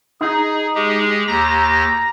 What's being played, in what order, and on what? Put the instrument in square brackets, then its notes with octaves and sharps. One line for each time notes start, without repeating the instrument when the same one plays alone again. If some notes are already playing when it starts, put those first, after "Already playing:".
[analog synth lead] D#4 [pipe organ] G#4
[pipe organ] G#3 G4 G#4
[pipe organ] D#2 G4 A#6 [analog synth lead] A#5